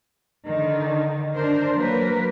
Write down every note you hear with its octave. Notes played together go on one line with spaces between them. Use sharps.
D3 D#3
D4 A#4 C5
F#3 A#3 A#4 B4